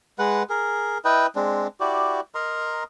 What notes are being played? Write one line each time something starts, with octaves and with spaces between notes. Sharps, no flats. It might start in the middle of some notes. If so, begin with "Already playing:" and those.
G#3 B4 F#5
G#4 A#4
E4 B4 D#5 G5
G#3 C4 D4
E4 F#4 G4 D5
A#4 D#5 A#5 C6